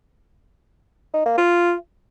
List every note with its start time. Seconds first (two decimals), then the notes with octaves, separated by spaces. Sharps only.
1.14 D#4
1.26 A#3
1.38 F4